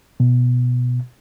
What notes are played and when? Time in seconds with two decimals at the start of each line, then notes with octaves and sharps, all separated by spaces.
0.20 B2